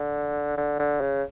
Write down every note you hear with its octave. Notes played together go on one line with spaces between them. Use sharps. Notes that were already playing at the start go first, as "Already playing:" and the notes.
Already playing: D3
D3
D3
C#3